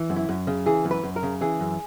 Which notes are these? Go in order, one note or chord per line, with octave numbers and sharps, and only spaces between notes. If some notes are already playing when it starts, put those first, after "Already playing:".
Already playing: E3
F#2
E4
F#2
C#3
E3 G#4
F#2
B4
F#2
A#4
C#3
E3 G#4
F#2